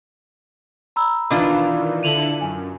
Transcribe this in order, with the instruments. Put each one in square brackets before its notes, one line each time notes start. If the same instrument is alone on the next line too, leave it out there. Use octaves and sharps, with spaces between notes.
[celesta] A#5 B5 E6
[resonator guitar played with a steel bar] B2 D4 F4 [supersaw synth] D#3 E3
[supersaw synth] D3 E4 A4 [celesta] D#7 F7 F#7
[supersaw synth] F#2 [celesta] G#5